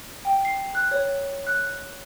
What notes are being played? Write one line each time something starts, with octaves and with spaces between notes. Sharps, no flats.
G5
C7
F#6
C#5
F#6